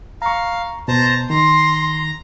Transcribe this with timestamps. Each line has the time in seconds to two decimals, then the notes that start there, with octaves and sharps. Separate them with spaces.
0.22 F5 A#5 C#6
0.88 B2 C5 A5 A#5
1.30 D#3 A#5 C6